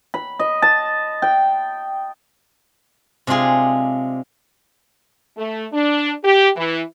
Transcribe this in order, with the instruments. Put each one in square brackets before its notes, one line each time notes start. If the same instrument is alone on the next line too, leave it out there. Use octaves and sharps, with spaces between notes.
[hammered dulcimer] B5
D#5
A5
G5
[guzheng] C3 G#3 D4 F4 G#4
[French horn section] A3
D4
G4
E3